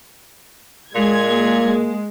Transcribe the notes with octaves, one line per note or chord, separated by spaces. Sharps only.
A#2 G#3 G#6
A#3
G#3